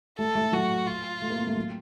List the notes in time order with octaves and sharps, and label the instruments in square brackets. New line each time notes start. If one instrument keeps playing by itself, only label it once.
[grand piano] A3 [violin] A4
[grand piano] A3
[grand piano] F#3 [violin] F#4
[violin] F4
[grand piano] A3
A#3
C4
A3
F#3